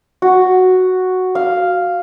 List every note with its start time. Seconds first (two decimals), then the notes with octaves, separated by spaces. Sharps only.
0.22 F#4
1.35 F5